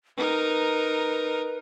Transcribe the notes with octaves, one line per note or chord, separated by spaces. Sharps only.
D#4 A#4 B4